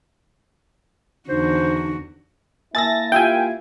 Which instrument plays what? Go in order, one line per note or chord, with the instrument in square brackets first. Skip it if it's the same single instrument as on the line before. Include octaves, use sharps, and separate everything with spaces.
[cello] E2 F#4 [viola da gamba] D3 [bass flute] D#4 [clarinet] C5
[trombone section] A#3 E4 [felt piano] G#5 A5 E6 [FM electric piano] A6 A#6
[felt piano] F4 G4 E6 [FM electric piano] G5 G#5